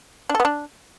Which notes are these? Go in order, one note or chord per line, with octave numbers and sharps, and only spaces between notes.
D4
A4
B3
D4